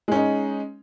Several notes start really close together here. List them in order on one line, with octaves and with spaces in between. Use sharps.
G#3 C#4 D#4